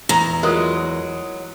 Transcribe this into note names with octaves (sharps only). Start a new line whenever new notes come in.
E2 A#5
F#3 G#3 F4 A#4